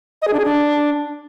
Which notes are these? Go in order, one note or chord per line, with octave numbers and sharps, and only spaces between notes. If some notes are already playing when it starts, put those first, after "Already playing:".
D#5
G#4
D4
G#4
D4